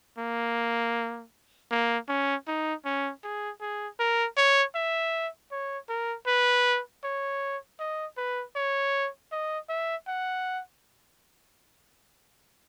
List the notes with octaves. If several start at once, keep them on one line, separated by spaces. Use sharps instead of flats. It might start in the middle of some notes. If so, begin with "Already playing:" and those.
A#3
A#3
C#4
D#4
C#4
G#4
G#4
A#4
C#5
E5
C#5
A#4
B4
C#5
D#5
B4
C#5
D#5
E5
F#5